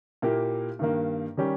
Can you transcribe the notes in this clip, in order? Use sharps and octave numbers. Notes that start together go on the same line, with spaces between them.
A#2 A#3 E4 G4 A#4
G2 D#3 A#3
D#3 G3 C#4 G4